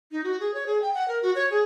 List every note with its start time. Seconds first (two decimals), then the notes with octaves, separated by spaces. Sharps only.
0.12 D#4
0.24 F#4
0.40 G#4
0.54 C#5
0.67 G#4
0.82 G5
0.94 F#5
1.08 A#4
1.22 F#4
1.35 C#5
1.51 G#4